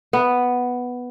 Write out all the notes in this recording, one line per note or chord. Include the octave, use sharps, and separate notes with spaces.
B3